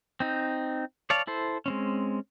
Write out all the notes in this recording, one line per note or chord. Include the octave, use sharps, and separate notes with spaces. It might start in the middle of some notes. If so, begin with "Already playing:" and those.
C4 D#4
C#5 D5 F5 A5
E4 A4 C5
G#3 C4 C#4